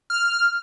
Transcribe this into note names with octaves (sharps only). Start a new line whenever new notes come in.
F6